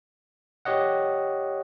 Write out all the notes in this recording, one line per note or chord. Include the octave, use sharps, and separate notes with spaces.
G4 C#5 D#5 F#5